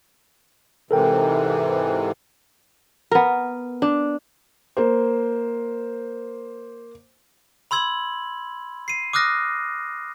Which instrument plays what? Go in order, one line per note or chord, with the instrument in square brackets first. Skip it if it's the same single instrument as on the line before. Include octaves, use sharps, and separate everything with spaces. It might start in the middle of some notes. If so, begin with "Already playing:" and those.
[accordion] G#2 C3 E3 [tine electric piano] A4 A#4 G5
[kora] B3 A#4
D4
[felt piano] A#3 C5
[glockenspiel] B5 C6 E6 G#6 F#7
C7 D#7
D6 D#6 F6 F#6 A#6